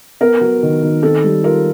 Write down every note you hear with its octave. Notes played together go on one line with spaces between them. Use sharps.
B3 A#4
F#3
D#3
D#3
C4 A4
G3
F4 A#4